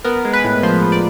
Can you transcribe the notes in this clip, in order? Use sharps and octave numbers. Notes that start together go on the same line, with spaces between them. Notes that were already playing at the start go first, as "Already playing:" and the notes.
B3 A#4
G#3
B4
A2
F3 C5
B3
D5